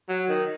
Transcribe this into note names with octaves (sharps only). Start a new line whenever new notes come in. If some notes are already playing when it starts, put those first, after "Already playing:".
F#3
D#3